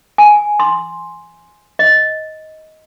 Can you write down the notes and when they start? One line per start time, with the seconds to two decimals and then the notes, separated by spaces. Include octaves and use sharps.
0.18 G#5
0.60 C6
1.79 D#5